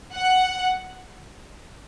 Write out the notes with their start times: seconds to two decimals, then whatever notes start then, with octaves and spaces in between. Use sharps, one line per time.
0.15 F#5